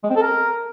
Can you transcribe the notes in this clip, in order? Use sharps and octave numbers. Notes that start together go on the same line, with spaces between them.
G#3
C4
A4
A#4